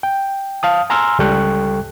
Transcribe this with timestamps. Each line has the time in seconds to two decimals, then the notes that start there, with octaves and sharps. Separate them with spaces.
0.03 G5
0.63 F5 A5 D#6
0.90 G#5 A#5 C6 E6 F6
1.19 C#2 G3 A4 G5 C#6 F#6